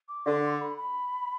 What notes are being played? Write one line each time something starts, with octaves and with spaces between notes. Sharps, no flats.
D6
D3 C6
C6
B5
B5